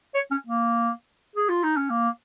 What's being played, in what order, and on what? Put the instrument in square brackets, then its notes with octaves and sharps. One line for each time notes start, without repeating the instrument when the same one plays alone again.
[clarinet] C#5
C#4
A#3
G#4
F4
D#4
C#4
A#3